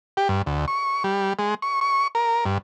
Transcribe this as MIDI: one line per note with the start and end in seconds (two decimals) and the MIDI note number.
0.17 0.28 67
0.29 0.42 43
0.46 0.66 38
0.68 1.03 85
1.04 1.33 55
1.39 1.54 56
1.62 1.80 85
1.81 2.08 85
2.15 2.45 70
2.45 2.58 43